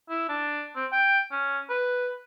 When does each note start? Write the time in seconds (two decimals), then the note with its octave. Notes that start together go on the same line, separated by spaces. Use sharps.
0.10 E4
0.29 D4
0.76 C4
0.92 G5
1.32 C#4
1.70 B4